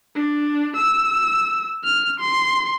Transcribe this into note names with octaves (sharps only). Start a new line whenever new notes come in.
D4
E6
F6
C6